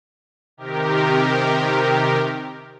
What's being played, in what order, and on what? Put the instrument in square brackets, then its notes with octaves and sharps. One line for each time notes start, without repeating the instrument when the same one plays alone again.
[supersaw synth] C3 D#3 G4 A#4